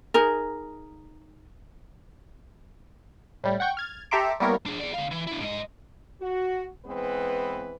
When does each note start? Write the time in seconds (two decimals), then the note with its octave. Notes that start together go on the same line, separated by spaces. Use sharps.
0.14 D#4 G#4 A#4
3.44 A2 G3
3.60 F#5 G5 C#6 G6
3.77 F6 G#6 A6
4.11 G4 A4 E5 A#5 C6 D6
4.40 G3 A#3 B3 E4 A#4 C#5
4.66 D4 G#4
4.80 G#4 D5
4.94 D3 F5
5.11 E3
5.27 D4 E4
5.40 G#2 D#5
6.20 F#4
6.85 E3 G#3 B3 C4 B4